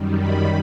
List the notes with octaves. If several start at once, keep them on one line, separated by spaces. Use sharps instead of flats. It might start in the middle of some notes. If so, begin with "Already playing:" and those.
Already playing: F#2 D#3 G3
B5